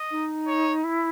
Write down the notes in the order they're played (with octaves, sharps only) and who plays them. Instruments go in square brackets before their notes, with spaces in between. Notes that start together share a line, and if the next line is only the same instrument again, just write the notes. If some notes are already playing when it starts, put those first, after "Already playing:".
Already playing: [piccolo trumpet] D#5
[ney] D#4
[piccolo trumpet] C#5
[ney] E4